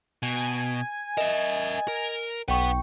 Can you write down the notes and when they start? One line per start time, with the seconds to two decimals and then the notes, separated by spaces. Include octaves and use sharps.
0.23 B2 G#5
1.17 A#4 D#5 E5
1.88 A#4
2.48 B1 B4 F#5 G5 C#6